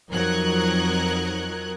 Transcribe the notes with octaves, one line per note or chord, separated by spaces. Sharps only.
F2 F#3 D#4 A#4 F#6 G#6